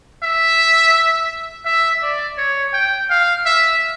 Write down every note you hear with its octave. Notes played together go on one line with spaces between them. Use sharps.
E5
E5
D5
C#5
G5
F5
E5